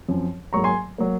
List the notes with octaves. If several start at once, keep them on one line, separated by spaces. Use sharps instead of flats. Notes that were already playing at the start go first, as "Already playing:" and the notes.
F#2 F3 C4
G#2 F#3 A#3 A#5 C#6
G#5 C6
F#3 A#3